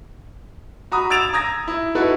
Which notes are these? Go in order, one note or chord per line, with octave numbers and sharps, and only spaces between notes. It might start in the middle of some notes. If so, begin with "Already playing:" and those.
F#4 A#5 B5 D#6
E6 G#6 A6 D7 E7 F7
A#5 D#6 G#6 A#6
E4
D#4 E4 F#4 A4 B4